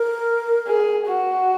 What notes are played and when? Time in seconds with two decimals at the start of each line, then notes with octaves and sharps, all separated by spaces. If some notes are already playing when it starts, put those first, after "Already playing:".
Already playing: A#4
0.67 G#4
1.07 F#4